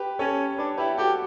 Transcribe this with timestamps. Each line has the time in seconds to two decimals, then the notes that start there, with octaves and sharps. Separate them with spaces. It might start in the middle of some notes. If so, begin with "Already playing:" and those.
Already playing: G4 B4
0.19 C#4 A4 C#5
0.58 D4 B4 D5
0.78 E4 G4 B4
0.98 F#4 G4 A4